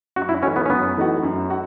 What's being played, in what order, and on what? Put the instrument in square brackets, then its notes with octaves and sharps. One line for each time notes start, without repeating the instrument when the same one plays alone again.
[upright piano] F#2 [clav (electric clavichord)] F#4
[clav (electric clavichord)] E4
[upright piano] E3 A3 D#4 F#4 [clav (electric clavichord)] C#4
[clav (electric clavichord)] B3
C#4
[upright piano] F#2 [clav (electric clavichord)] B3
[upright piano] E3 A3 D#4 F#4
F#2
F#4